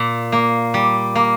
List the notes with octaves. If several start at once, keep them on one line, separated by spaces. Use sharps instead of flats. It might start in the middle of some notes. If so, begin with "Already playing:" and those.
Already playing: A#2
A#3
G3
A#3